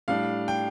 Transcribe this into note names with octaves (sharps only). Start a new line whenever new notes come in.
A2 G3 D4 F5
G5